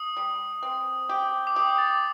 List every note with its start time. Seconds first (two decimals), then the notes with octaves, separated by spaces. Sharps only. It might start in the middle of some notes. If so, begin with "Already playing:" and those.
Already playing: D#6
0.17 G3
0.63 C4
1.09 G4
1.47 D6
1.55 G4 D#6
1.78 A6
1.91 D6